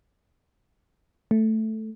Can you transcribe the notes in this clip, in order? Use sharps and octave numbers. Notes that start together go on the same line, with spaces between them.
A3